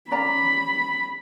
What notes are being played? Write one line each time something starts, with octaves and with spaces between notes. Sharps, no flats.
C#4 D5 A#5 B5